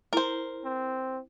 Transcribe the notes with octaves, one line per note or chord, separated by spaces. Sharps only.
E4 A#4 C5
C4